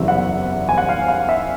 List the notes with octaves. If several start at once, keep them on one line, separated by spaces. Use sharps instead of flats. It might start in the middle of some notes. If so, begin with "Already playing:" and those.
Already playing: F#1 E2 C3 E3 G3 E5
F#5
G#5
F#5
F5
F5
E5